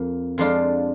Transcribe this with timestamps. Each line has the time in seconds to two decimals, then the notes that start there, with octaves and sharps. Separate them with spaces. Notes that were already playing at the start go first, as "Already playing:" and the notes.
Already playing: F2 F3 A#3
0.38 F2 F3 G#3 D4 F4